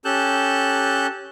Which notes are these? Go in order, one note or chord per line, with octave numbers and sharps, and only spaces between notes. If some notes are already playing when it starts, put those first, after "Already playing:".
C#4 G4 A4 A5 F#6 G6